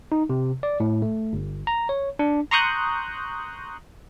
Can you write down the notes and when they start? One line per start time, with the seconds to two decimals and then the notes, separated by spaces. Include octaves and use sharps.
0.12 D#4
0.30 C3
0.63 D5
0.80 A2
1.02 A3
1.33 G1
1.67 A#5
1.89 C#5
2.19 D4
2.51 A#5 C6 C#6 D#6 F#6 G6